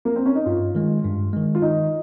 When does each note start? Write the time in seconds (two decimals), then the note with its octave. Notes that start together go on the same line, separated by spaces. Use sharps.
0.05 A#3
0.16 C4
0.26 C#4
0.35 D#4
0.46 G2 F4
0.75 D#3 G#3
1.04 G2
1.33 D#3 G#3
1.55 F4
1.62 D#3 D#4